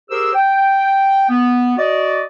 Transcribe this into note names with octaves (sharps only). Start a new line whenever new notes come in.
G4 G#4 A#4 C5 E6
G5
B3
F#4 D5 D#5